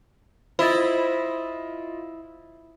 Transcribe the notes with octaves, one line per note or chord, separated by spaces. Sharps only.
E4 F4 C5 D#5 A6